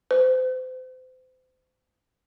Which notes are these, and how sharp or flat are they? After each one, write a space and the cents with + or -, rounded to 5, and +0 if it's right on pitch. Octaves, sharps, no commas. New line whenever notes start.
C5 -35